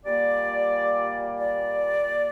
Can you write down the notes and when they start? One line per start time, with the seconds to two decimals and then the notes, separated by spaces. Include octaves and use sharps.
0.04 A#2 G3 A#3 D5
1.39 D5